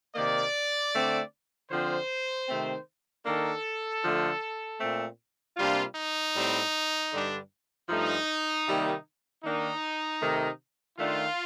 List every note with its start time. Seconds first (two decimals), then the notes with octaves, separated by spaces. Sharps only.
0.15 C3 D#3 A#3 D5
0.93 D3 A3 C4
1.70 D3 F3 C4 C5
2.48 C3 D#3 A3 C4
3.25 D#3 A#3 D4 A4
4.03 D3 F3 A3
4.80 A#2 A3 C4
5.57 C3 G3 A#3 D4 F4
5.95 D#4
6.34 A2 G3 C4
7.12 G2 D3 G3 D4
7.89 G2 F3 A3 D#4
8.66 C3 D#3 G3 A#3
9.43 D#3 A#3 D4 D#4
10.20 C3 D#3 A3
10.97 D#3 A3 D4 F4